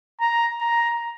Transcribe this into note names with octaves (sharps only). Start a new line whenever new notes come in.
A#5
A#5